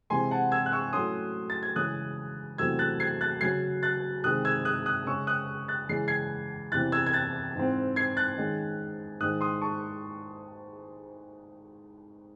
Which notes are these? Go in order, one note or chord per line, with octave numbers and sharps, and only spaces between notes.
C3 E3 G#3 G#5 C6
F#5 A5
E6 G#6
F#6
C#6 E6
A2 F#3 A3 C#4 C6 D#6
A6
G#6
C#3 E3 G#3 C#4 D#6 F#6
E2 C3 F#3 A3 C4 E6 G#6
F#6 A6
G#6 C7
F#6 A6
C#3 F#3 C#4 G#6 C7
F#6 A6
C3 D#3 G#3 D#6 F#6
E6 G#6
D#6 F#6
D#6 F#6
C#3 G#3 C#4 C#6 E6
D#6 F#6
F#6 A6
C#3 E3 G#3 C#4 C7
G#6 C7
E2 C3 E3 F#6 A6
E6 G#6
G#6
F#6 A6
G#2 E3 C4
G#6 C7
F#6 A6
D#3 G#3 C#4
G#2 D#3 G#3 D#6 F#6
C6 D#6
A5 C#6